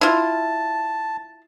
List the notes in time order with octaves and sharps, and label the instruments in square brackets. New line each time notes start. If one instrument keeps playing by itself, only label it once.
[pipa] E4 F4 [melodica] A5